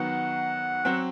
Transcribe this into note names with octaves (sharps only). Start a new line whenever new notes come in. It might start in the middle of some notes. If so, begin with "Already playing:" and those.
Already playing: D#3 F#3 B3 F#5
F#3 C4 F#5